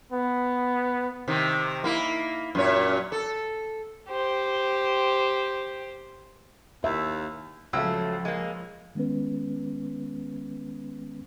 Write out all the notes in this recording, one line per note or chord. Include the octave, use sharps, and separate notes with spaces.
B3
C3 D#3
A#3 E4
F#2 A#2 C#5
A4
G4 C5
D#2 E5
C#2 F3 F#3 A3 E6
G#3 A#3
D#3 G#3 B3 C#4 B4